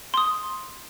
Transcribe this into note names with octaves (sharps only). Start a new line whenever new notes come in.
C6 D#6